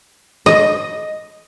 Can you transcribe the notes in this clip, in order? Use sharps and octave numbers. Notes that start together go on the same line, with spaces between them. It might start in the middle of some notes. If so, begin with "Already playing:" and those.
D#5